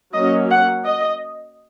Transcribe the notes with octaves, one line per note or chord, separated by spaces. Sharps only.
F#3 A#3 C#4 D#5
F#5
D#5